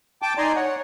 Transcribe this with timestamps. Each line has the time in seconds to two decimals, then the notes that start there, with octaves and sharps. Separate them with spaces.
0.22 G5 A5 D6
0.38 D#4 D5 G#5 A#5 C6
0.56 C#5 F#5